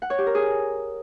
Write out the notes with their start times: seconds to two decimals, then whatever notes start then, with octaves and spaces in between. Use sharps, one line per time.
0.02 F#5
0.10 C#5
0.18 G4
0.26 A#4
0.35 G#4